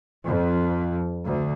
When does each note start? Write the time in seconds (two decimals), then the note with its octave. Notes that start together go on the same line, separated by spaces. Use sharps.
0.24 F2
1.24 D2